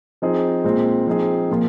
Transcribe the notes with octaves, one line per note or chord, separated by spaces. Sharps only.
F3 C4 D#4 G#4
A#2 G#3 C4
F3 C4 D#4 G#4
A#2 F3 A#3 F4